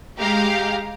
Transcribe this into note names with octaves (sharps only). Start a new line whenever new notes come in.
G#3 G4 F5 A#5